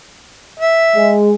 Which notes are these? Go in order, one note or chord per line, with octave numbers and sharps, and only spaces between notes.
E5
G#3